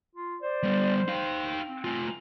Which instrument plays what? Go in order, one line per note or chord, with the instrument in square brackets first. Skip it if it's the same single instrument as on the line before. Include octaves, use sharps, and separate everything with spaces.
[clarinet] F4
[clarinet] C5 [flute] D5
[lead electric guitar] G3 B3
[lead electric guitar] D#4 F5 [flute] G5
[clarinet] C4
[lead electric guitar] A3 F4 [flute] G#5